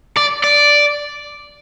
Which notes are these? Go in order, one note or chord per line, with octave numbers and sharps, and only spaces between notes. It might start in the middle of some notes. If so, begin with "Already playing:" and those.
D5
D5